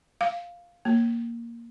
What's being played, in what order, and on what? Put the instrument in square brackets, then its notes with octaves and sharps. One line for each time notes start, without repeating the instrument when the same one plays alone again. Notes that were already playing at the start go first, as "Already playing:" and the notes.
[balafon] F5
A#3